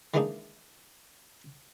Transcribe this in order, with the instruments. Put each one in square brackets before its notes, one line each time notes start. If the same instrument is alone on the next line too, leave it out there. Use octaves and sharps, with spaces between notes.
[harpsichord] D#3 E3 G#3 A#3 D4 D#4